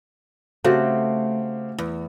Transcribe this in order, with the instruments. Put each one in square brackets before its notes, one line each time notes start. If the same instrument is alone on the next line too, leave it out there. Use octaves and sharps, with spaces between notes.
[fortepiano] C#3 C4 G4 [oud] A3 [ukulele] F#4
[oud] E2